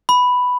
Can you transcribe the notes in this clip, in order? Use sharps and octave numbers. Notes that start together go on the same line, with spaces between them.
B5